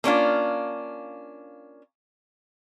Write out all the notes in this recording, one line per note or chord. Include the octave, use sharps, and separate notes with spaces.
A#3 C#4 D4 F4